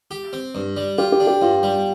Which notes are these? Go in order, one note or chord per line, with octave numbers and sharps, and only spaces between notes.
G4
C4
G2
G3
F4 G4
G4
D4
G4
G2 F4
G3